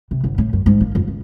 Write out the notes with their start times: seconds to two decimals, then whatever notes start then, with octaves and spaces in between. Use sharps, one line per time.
0.11 C3
0.24 G1
0.38 A2
0.53 F#2
0.66 G#2
0.81 A#3
0.95 F2
1.08 C#2